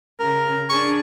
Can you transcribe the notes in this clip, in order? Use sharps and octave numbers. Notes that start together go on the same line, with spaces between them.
C#3 A#4
D4 G#4 C#6